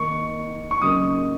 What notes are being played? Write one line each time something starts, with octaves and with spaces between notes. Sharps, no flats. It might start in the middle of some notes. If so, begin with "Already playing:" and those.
Already playing: D#3 A#3 D#4 C#6
C#6
C#3 F#3 A#3 D#4 D#6